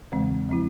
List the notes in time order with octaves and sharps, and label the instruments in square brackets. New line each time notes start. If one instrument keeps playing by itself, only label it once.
[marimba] E2 C#3 E3 G#3 C4
F3 C4 E4